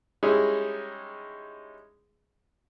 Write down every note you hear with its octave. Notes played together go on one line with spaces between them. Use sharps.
G3 G#3 C#4 D#4 E4 G#4